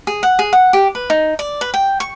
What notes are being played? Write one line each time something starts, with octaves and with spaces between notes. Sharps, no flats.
G#4
F#5
G#4
F#5
G4
B4
D#4
D5
B4
G5
C#6